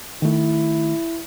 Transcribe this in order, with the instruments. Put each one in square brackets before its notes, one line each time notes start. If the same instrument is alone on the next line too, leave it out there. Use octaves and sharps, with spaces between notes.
[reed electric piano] D#3 A3 [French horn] E4